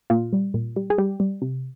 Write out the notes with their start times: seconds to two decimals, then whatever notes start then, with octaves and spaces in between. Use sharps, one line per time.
0.10 A#2 F4
0.33 G3
0.54 A#2
0.76 G3
0.90 G#4
0.98 G3 G4
1.20 G3
1.42 C3